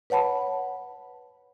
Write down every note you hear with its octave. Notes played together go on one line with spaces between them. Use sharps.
B4 C#5 F#5 A5 B5